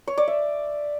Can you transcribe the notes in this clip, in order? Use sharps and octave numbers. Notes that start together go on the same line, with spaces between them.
C#5
D5
E5